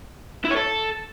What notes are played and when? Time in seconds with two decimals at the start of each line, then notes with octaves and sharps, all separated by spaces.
0.45 E4
0.51 C#5
0.56 A4